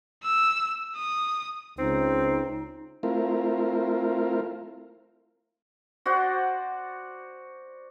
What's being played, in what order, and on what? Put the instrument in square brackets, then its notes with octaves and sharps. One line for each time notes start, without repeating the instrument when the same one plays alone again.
[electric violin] E6
D#6
[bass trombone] C#2 [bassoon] C4 [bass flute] D#4
[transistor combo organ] A3 C4 E4 F4 A#4
[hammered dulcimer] F#4 C5 D5 F#5